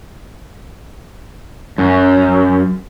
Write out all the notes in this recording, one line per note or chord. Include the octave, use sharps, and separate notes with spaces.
F#2